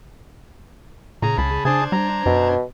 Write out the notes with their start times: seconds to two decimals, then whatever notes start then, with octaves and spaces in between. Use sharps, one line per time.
1.22 A#2 C#3 G#4 A#5
1.38 C#2 A5 B5
1.65 C#3 D4 G#4 C5 A5 G#6
1.92 G3 A#5
2.26 F#2 B2